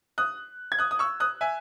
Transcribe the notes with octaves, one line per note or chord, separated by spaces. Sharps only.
D#6 F#6
G#6
D#6 F#6
D#6
C#6 E6
D#6 F#6
E5 G#5